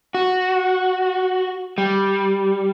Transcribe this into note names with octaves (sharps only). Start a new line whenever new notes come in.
F#4
G3